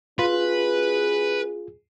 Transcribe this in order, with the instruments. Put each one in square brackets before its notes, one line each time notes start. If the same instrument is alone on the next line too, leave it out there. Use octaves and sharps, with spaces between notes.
[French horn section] C#4 F#4 G#4 [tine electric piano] F4 [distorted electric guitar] B4